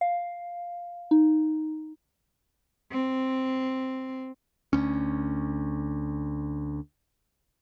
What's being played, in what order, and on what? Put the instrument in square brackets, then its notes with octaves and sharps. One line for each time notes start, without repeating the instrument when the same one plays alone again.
[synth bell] F5
D#4
[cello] C4
[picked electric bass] D2 C#4